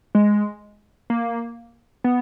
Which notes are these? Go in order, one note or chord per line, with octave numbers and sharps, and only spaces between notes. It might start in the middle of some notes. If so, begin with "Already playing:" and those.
G#3
A#3
B3